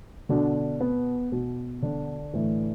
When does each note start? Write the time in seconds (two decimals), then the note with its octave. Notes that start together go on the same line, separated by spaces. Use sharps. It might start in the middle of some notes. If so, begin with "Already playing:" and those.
0.29 B2 D3 D4
0.80 B3
1.32 B2
1.82 D3 D4
2.34 A2 E3